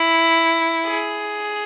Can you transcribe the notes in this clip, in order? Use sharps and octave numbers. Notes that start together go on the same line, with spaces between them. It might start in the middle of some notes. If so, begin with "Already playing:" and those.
Already playing: E4
G#4